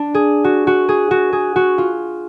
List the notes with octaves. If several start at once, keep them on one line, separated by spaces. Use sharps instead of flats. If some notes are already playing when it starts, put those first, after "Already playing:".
Already playing: D4
G#4
F#4
F#4
G#4
F#4
G#4
F#4
F4